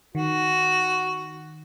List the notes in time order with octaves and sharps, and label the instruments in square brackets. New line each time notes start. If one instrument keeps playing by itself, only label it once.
[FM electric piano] D#3 [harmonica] F#4